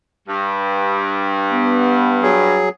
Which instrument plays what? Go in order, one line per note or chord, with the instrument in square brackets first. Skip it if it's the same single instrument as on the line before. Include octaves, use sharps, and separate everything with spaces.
[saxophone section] G2
[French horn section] B3
[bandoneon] F#3 G#4